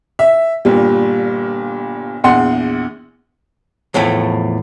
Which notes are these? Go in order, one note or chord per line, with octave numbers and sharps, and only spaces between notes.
E5
G1 A#2 G3
A#1 E2 F#5 C6
E2 A2 F3 A3